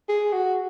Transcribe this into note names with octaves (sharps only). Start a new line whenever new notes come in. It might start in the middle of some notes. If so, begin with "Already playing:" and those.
G#4
F#4